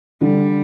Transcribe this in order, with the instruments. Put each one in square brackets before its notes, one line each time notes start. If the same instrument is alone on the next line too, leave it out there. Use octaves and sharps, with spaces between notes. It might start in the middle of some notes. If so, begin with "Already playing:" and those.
[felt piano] D3 [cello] G3